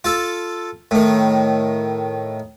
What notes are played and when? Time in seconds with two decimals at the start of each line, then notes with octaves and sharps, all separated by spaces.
0.04 F4 A4
0.91 A2 D#3